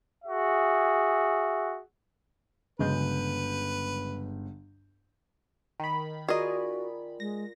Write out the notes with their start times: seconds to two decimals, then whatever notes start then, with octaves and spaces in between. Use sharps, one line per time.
0.24 F#4 G#4 E5
2.79 G1 C#3 F#3 G#3 B4 G6
5.80 D#3 B5
6.28 F4 F#4 G#4 A#4 D5 D#5
7.20 G#3 A#6